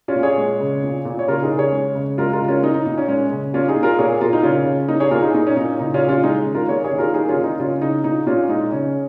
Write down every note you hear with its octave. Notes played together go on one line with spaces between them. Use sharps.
C#4 F4
A#2
G#4 C#5
G#3
C#3
A#2
A#2
C#5
C#3 F4 A#4
D#4 G#4
C#3
G#4 C#5
G#3
C#3
G#3 F4 A#4
F4 A#4
C#3
C#4 F4
A#3 D#4
D#4
A#2 D#4
C#4
G#3 C#4
C#3
A#3 C#4 F4
D#4 G#4
A#2
F4 A#4
A#2 G#4 C#5
A#2 F4 A#4
D#4
C#3 C#4 F4
C#3
A#3 D#4
G#4 C#5
A#2 F4 A#4
D#4 G#4
A#3 D#4
C#4
A#2 D#4
C#3 D#4
C#4 F4
C#3
C#4 F4
G#3 D#4 G#4
D#3
F4 A#4
A#3 G#4 C#5
G#4 C#5
D#3
F4 A#4
A#3 D#4 G#4
C#4 F4
D#3
D#4
C#3 C#4 F4
C#3 D#4
A#2 D#4
A#2 C#4 F4
G#3 D#4
C#3 C#4